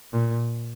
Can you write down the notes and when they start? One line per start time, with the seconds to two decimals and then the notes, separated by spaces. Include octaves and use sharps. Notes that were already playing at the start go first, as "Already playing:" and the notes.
0.12 A#2